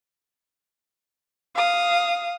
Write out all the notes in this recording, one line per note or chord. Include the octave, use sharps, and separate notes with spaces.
F5 D#6